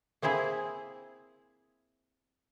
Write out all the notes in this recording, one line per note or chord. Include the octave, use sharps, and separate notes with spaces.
A#3 C4 E4 G#4